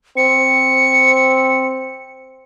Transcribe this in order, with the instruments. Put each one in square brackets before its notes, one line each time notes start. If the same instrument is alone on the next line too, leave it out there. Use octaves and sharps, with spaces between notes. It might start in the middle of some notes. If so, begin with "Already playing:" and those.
[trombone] C4 [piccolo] C#7